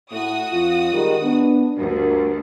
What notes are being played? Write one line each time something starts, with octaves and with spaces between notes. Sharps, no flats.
A2 F#4 D#6
F2 F4
D#3 G3 G#3
B3 D4
D2 G2 F#4 A#4